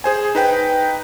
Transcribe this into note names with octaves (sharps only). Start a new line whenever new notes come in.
G#4 C5 G#5
D#4 B4 G5